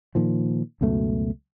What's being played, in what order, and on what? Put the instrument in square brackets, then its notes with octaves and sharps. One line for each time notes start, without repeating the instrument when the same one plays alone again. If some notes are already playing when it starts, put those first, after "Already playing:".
[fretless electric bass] A#2 D#3 F3
C#2 F#2 B2 A3